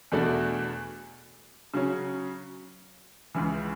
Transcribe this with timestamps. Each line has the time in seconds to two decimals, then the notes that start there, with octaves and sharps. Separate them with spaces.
0.12 E2 B2 A3 D4 F#4
1.74 C#3 F#3 C#4
3.35 C#2 C#3 E3